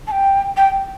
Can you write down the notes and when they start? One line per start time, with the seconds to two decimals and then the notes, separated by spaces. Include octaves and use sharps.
0.07 A5
0.12 G5
0.57 G5